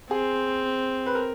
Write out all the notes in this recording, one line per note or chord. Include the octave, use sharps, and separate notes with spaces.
C4 G#4
B4
A#4